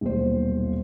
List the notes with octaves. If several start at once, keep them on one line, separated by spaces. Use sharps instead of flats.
D#1 B1 A#2 C5